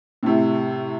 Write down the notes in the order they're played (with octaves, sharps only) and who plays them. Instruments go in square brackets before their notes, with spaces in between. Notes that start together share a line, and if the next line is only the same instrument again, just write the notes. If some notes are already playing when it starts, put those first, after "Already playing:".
[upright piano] A2 C3